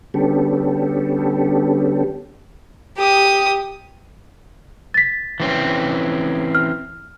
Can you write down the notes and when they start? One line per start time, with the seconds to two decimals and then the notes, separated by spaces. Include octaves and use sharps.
0.14 D3 G3 B3 C#4 G4 A4
2.98 G4 D#6
4.94 A6 B6
5.40 E3 C4 C#4
6.55 F6